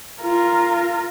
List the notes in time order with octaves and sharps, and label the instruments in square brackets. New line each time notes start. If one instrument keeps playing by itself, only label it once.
[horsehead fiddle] F4 A#4